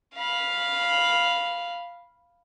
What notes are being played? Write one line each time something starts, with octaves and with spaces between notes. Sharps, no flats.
F5 B5